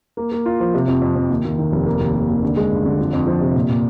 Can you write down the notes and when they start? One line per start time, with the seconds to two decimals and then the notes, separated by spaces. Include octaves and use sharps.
0.17 A#3
0.32 A#3
0.46 F4
0.60 F3
0.74 C3
0.88 F2
1.02 F2
1.16 F2
1.30 D#2
1.45 D#2
1.58 D#3
1.72 F1
1.86 A#3
2.00 D#2
2.15 A#3
2.29 D#2
2.43 D3
2.56 G#3
2.71 G2
2.85 D3
2.99 F2
3.13 F2
3.27 F3
3.41 C3
3.55 A#2
3.69 A#2